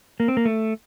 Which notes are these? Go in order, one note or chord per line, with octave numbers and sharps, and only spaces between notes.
A#3
C4
A#3
A3